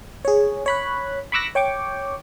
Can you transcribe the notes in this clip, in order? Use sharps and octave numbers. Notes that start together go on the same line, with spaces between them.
G#4 C#5
C#5 B5 F#6
B5 C#6 D6 E6 F#6 A#6
C#5 G5 C#6 D6